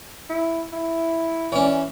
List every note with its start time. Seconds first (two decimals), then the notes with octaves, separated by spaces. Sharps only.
0.29 E4
0.73 E4
1.52 E3 C#4 D5